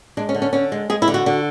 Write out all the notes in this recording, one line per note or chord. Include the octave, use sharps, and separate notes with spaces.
G#3 D4
C#4
D3
C#4
D3 C#4
G#3
G#3 G#4
E4
D3
F#4
D3